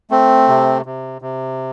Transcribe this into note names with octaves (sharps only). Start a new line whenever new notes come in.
A3 C4
C3
C3
C3